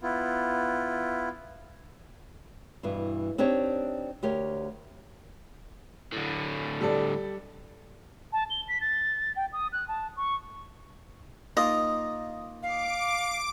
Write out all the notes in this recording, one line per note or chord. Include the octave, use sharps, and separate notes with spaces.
B3 E4 F4
G2 B2 E3
C4 D4 D#4 G4 C#5
D2 G4 A#4 C#5
A2 D3
G3 A4 D5
A5
G7
B6
A6
G5
D#6
F#6
A5
C#6
A#3 D#4 F4 D#5
F5 D6 D7